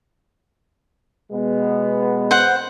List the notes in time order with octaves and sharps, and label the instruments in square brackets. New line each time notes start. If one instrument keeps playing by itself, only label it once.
[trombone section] B2 G#3 B3
[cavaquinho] C5 F#5